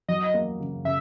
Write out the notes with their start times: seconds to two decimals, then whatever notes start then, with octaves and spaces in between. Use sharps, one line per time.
0.08 F#3 D#5
0.34 A#3
0.60 C#3
0.85 C#3 E5